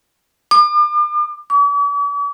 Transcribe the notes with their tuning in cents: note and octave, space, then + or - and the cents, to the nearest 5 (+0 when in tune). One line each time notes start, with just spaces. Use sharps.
D6 +40
D6 -45